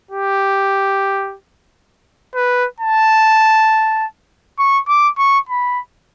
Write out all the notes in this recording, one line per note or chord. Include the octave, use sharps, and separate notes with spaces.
G4
B4
A5
C#6
D6
C#6
B5